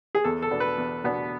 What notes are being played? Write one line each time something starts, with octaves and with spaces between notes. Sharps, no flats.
G#4
E2 A4
A4
B2 B3 D4
B4
E2
B2 B3 D4